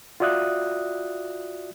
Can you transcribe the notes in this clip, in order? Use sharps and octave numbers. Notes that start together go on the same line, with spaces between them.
F4 F#4 D5 E5 D#6 F#6